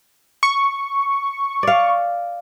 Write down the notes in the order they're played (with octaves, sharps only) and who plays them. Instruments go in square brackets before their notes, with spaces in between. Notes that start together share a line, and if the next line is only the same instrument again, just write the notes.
[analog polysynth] C#6
[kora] D5 F5